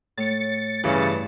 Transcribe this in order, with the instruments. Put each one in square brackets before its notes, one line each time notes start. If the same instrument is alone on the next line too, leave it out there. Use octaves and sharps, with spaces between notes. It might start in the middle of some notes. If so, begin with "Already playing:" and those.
[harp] A2 [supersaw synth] A6 C#7
[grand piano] G2 E3 [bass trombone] C#3